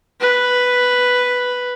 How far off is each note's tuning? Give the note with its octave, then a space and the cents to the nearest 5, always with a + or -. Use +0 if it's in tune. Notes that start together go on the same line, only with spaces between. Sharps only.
B4 +0